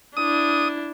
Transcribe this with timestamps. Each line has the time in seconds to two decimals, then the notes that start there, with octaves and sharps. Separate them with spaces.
0.17 D4 E4 D#6